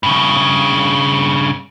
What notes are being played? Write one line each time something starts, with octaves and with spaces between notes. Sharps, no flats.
G2 C#3